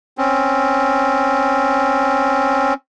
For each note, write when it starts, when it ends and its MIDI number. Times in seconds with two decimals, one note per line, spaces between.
0.18 2.74 60
0.18 2.74 61